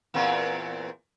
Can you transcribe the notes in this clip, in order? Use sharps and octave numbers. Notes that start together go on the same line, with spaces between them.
E2 A#2 C4